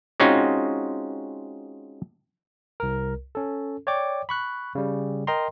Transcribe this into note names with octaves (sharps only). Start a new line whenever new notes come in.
G#3 C4 C#4 D#4 F4 F#4
C2 A#4
C#4 A4
C#5 D5 G5 D6
B5 C#6 F#6
C#3 G3
A#4 D#5 G5 A#5 C6